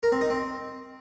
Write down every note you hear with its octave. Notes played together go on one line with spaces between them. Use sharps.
A#4
C4
D#4
C4